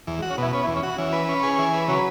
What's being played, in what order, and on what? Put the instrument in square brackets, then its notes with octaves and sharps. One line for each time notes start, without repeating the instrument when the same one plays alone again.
[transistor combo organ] E2
[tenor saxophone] G#3
[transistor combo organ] F#4
[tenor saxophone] C#4
[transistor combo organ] B2 [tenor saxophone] E4
[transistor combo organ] B3 [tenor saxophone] C#4
[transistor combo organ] E2 [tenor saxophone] E4
[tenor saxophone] C#4
[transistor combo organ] F#4
[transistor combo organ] E3 [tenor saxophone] C#4
[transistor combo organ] B4
C#4
G#4
E3
B4
[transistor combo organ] C#3 [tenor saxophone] F#3